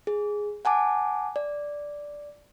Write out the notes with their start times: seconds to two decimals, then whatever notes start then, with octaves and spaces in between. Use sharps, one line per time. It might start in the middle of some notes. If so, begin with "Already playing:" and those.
0.07 G#4
0.65 F#5 G#5 A5 D6
1.36 D5